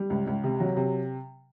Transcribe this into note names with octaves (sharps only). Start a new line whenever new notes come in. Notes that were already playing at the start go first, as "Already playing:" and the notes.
Already playing: G3
C#2
C#2
C3
F#3
C3